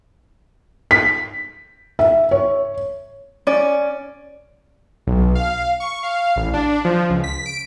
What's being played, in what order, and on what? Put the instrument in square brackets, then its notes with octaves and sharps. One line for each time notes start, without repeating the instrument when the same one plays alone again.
[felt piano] B6
E5
C#5
[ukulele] C#4 D5
[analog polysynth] B1
F5
C#6
F5
A1
D4
F3
C#2
B6
D7